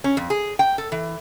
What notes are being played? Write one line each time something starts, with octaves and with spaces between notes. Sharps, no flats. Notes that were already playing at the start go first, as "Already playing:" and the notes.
C#4
F2
G#4
G5
A4
E3